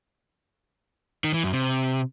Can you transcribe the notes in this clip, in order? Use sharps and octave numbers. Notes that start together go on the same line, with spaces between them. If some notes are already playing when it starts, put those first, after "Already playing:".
D#3
E3
F#2
C3